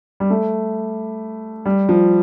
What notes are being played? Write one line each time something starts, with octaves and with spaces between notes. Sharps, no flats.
G3
A3
G3
F3